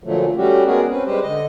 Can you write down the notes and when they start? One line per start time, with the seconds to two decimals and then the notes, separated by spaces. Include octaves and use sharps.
0.04 A#2 D3 F3 F#3 A3
0.36 G3 A3 C#4 F#4 G4
0.65 G#3 B3 C#4 F#4 G#4 A#4
0.90 C4 C#4 B4
1.05 G3 G#3 G4 B4 C5
1.23 D3 D#5